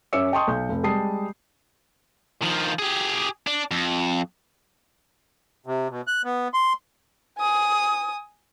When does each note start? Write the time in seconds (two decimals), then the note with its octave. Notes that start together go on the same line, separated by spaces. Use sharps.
0.13 F#2 C#4 E5 D6 E6 C#7
0.32 D#5 G5 A5 C6 C#6 D#6
0.47 B1 G6
0.69 F1
0.83 G3 G#3 A5 D#6 C7
2.42 D#3 F3
2.79 G4 G#4
3.47 D4
3.71 F2
5.67 C3
5.90 B2
6.07 F#6
6.25 B3
6.54 C6
7.38 G#5 D#6